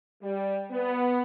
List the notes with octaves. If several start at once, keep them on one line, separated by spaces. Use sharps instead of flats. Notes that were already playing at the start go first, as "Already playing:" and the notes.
G3
B3